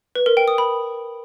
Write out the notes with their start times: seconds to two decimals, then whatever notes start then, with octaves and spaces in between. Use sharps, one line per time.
0.15 B4
0.26 A#4
0.37 G5
0.48 D#6
0.58 B5